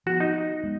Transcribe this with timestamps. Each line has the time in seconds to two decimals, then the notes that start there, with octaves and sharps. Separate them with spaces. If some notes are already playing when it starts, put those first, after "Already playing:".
0.06 F3 B3 F#4
0.20 D#4
0.63 G#3 B3